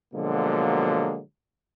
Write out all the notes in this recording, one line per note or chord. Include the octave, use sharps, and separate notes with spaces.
B2 D3 F3 F#3 G#3 A#3